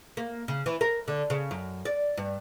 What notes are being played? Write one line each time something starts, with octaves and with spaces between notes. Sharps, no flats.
A#3
C#3
E3
A#4
D3
C#3
F#2
D5
G2